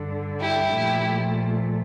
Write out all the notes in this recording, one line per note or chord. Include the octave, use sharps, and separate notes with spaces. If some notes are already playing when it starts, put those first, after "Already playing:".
Already playing: G2 D3 G3
E4 G4
A#2 F3 A3